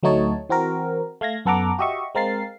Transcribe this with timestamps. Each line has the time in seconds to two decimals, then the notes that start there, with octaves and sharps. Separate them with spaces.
0.03 D2 F#3 A3 D#4 C#5 A5
0.49 E3 C4 F#4 A#4
1.21 A3 F5 G#6 A#6
1.45 F#2 B3 A4 F#5 A#5 D6
1.79 F#4 G4 D#5 E5 C#6
2.15 G#3 C4 A#4 F5 A6 C7